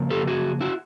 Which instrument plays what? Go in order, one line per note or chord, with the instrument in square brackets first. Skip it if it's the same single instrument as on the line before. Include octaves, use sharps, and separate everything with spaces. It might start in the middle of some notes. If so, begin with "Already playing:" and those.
Already playing: [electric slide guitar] C#3 F3 A#3
G4 A4
F#4 G#4
E4 F#4